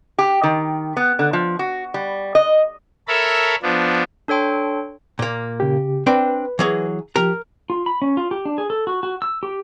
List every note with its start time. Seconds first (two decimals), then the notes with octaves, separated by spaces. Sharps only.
0.18 G4
0.43 D#3
0.97 B3
1.19 D3
1.33 F3
1.59 F#4
1.94 G3
2.35 D#5
3.08 A4 A#4 C#5 E5 A5 B5
3.63 F3 B3 D4
4.28 D4 A4 C#5 G5 C6
5.19 A#2 A#3
5.60 C#3 G4
6.07 C4 D4 B4 G5
6.59 E3 F#3 G#4
7.16 F3 G4 A#4 A#5
7.70 F4
7.86 B5
8.02 C#4
8.17 F4
8.31 G4
8.45 D4
8.58 G#4
8.70 A4
8.87 F#4
9.03 F#4
9.22 E6
9.43 G4